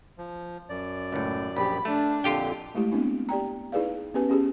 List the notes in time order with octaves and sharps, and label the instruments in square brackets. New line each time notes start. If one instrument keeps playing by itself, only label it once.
[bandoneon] F3
F#2 D5
[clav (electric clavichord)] C#2 A2
[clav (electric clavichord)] A#1 [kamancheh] G4 B5
[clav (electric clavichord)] A3 [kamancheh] D4
[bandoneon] F2 A#2 D3 [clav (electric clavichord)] F4 G4 G5
[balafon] G#3 A3 E4 G4
B3 C4 D4 E4
G4 D5 G5 A#5
D#4 E4 G#4 B4 D5 F5
B3 C#4 G4 B4 G#5
C#4 G4 G#4